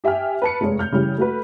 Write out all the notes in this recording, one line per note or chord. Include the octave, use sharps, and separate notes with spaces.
G4 E5 G5 G#5 F6
B4 A5 C#7
F1 G#3 C#5
F6 G6
C#3 E3 G3
A3 F#4 A4 B4